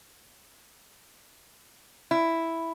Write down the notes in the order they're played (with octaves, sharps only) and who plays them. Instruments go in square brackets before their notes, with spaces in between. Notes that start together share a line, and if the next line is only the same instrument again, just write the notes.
[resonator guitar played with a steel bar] E4